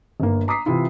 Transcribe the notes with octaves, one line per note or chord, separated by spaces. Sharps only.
G1 A#3
A#5 D6 D#6 B6 C7
C3 E3 E4 F4